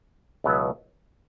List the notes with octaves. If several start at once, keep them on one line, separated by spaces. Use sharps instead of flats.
C#2 B2 F#3 B3 E4